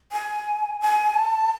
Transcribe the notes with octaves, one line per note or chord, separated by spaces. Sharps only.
G#5
G#5
A5